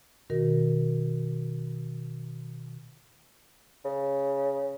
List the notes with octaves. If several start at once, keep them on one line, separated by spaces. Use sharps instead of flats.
B2 D#3 F#4 A#4
C#3